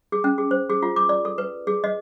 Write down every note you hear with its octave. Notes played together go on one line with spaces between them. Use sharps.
G#4
C#4
G#4
C5
G#4
F4
D6
D5
A4
B4
G#4
D#5